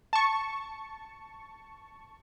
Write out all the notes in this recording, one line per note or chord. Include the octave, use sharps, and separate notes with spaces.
A5 C#6